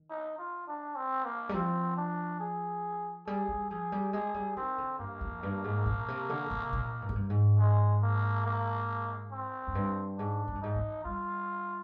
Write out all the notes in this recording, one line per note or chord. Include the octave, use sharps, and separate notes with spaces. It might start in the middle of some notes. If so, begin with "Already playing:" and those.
Already playing: D#3
D#4
F4
D4
C4
A#3
G3
F3 C4
D4
G#4
G3 G#4
G3
F3 G#4
G3
G#3 G#4
G3
D#3 C4
D3
G2 A#3
F2
G2
G#2
A#2
C3
D3
C3
A#2
G2
G#2
G2
G#2
G#3
A#3
A#3
C4
F2
G2
G#2 D4
G#2
G2
G#2 D#4
D#3
G3 F4